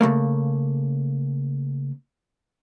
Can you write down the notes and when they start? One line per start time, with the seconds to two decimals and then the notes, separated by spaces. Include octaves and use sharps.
0.01 C#3 F3 A3 A#3